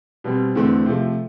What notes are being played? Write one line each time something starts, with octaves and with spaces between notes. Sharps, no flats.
B2 G3 C4
E2 D3 A3 C4
C3 F3 A3